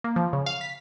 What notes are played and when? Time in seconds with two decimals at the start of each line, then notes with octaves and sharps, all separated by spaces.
0.04 A#3
0.16 F3
0.33 C#3
0.46 F5
0.61 B6